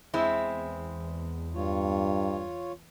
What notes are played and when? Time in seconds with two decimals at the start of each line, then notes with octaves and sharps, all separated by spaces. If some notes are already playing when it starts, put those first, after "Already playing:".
0.14 E2 G#3 C4 E4
1.55 G2 F4 C#5